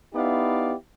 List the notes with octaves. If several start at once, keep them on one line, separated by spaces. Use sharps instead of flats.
B3 D#4 E4 G4 D5 F5